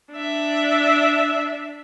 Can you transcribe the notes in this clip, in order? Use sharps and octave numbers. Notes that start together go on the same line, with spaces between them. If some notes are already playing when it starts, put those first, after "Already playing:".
D4 E5